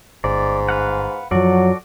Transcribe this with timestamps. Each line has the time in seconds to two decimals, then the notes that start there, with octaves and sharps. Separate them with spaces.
0.24 G1 G#2 D5
0.69 B4 F5 F#5
1.31 F#2 F3 F#3 F#4 A4 D5